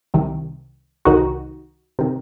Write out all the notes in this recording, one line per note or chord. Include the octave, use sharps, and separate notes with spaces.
C2 C3 D#3
C2 C3 D#3 D#4 F#4
C3 D#3